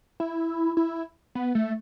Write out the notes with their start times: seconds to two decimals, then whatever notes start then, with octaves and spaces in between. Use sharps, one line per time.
0.20 E4
0.77 E4
1.35 B3
1.55 A3